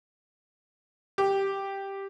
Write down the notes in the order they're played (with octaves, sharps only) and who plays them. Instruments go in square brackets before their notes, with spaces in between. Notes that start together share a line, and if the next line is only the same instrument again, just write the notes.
[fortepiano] G4